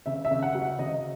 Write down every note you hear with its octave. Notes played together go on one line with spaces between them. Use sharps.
C#3 E5
E5
C#3
F#5
F#3
E5
C#3 D#5